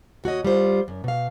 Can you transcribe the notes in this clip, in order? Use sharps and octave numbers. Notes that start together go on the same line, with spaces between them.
D#2 F#4 C#5 D#5
G3 F4 C5
F#2
B2 F5